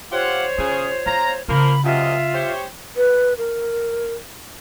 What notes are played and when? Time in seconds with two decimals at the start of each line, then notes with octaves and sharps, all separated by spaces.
0.12 F4 G4 C5 C#5 F#5
0.59 C#3 F4 G#4
1.06 B3 F4 A#5
1.48 C#3 F3 A#3 C#4 A#4 B5
1.84 F#2 C3 F4 D#5 E5
2.34 G4 C5 C#5
2.97 B4
3.38 A#4